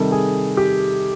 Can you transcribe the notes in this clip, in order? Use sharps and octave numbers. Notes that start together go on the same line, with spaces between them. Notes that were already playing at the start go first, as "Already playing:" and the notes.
Already playing: C3 D#3 G3 A4
G#4
G4